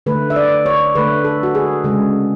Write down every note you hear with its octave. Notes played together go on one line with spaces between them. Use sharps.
D3 A3 B4
E5
D5
C#5
D3 A3 B4
A4
F#4
G#4
C#3 G#3